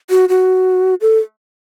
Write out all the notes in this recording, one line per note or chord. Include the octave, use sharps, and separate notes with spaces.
F#4
F#4
A4